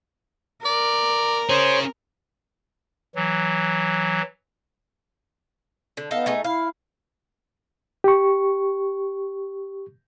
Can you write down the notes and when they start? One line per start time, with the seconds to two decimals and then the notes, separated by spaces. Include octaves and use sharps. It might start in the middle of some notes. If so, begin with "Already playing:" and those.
0.65 A#4 D5
1.50 C#4 G#4 C5 C#5
3.15 E3 F#3
5.97 D3
6.11 B3 D#4 A4 F5
6.26 A3 D#4 G#4
6.44 E4 F5
8.04 G4 C#6